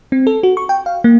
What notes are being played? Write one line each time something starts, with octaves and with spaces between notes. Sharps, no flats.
C4
A4
F#4
C#6
G5
F5
A#3